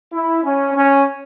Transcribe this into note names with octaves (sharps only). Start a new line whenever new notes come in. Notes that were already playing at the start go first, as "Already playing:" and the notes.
E4
C#4
C#4